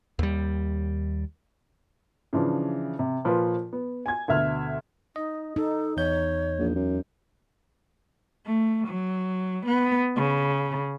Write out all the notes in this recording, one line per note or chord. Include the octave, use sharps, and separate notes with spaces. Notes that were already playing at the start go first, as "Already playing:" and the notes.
D#2 G3
C#3 E3 F3 D4
C3
A#2 F3 F4 B4
B3
G#5 G#6
D2 B2 E5 F6
D#4 D#5
D#4 A4
E2 C#5 G6
A#1
F#2
A3
F#3
B3
C#3